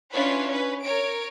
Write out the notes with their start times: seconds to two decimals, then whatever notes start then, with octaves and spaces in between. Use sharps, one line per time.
0.12 C#4 D4 E4 F4 B4 C#5
0.49 C#4 B4
0.82 A#4 C#5 D7